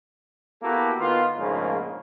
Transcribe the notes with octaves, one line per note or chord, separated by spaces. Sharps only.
A#3 B3 E4 F#4 G4 A4
D#3 B3 F4
A#1 G#2 C#3 F3 A3 A#3